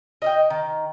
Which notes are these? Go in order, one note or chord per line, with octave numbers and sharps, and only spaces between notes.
D#5 F5 G5
D#3